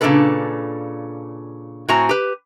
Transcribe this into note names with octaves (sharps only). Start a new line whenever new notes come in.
A#2 C#3 A#3 D4 A4 B4
A2 C4 F#4 G#5 A#5
G4 B4